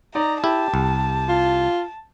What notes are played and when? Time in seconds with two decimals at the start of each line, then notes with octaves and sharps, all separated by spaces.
0.15 D#4 D5 A#5
0.44 E4 G4 A5
0.74 C2
1.29 F4